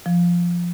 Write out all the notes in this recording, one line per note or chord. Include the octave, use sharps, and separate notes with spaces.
F3